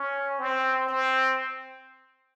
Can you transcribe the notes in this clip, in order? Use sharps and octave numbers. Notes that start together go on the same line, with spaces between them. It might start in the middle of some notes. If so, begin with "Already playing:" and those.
Already playing: C#4
C4
C4